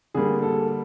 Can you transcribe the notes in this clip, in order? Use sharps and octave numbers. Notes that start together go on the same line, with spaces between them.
D3 G3 A#3 G#4
A4